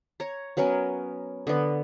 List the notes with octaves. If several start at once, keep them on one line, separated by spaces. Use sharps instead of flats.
C#5 A#5
F#3 B3 C#4 A#4
D3 B3